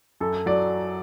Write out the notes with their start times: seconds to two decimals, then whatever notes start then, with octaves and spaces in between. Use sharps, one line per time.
0.21 F#2 A4
0.46 F#3 D5